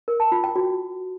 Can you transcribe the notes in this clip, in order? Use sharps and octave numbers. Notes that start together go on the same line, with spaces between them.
A#4
A5
F4
G5
F#4